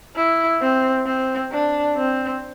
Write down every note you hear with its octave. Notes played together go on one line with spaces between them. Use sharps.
E4
C4
C4
D4
C4